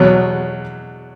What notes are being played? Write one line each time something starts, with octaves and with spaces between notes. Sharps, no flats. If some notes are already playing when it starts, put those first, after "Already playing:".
Already playing: E2 B2 F#3